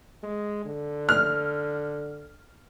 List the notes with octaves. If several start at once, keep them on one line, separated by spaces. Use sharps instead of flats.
G#3
D3
F6